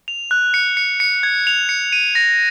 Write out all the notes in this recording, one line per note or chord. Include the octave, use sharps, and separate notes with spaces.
F7
F#6
C#7
C#7
C#7
G#6
F7
C#7
D#7
A#6